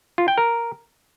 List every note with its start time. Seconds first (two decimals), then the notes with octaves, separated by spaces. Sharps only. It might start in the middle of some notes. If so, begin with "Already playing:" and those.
0.18 F4
0.28 G5
0.38 A#4